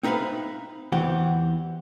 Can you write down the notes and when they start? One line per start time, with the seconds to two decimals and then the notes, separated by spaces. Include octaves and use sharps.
0.03 C4 D#4 B4 E5 F5 B5
0.92 E2 E3 C4 G4 F#5